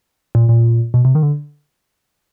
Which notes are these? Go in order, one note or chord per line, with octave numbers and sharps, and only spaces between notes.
A#2
A#2
B2
C3
D#3
D3